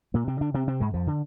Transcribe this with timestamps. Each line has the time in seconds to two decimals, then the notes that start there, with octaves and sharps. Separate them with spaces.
0.14 A#2 A#3
0.27 C3 C4
0.41 D3 D4
0.54 C3 C4
0.67 C3 C4
0.80 G#2 G#3
0.94 F2 F3
1.07 D3